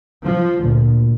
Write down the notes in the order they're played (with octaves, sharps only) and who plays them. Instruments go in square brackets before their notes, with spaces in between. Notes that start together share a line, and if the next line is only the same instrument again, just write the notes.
[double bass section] F3
[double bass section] D2 [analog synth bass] A#2